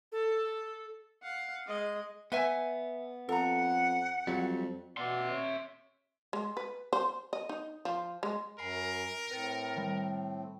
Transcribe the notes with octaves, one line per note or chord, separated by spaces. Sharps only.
A4
F5 F#5
G#3 D#5
B3 B4 E5 G#5
F2 A4 F#5 A#5
F2 F#3 G3
B2 B3 D5 E5 C6
C#5
G#3
B4
C5
D#5
D#4
F3
G#3
F#2 A#4 G#5 B5 C7
A2 C4 B4 A6 C#7
D#3 G3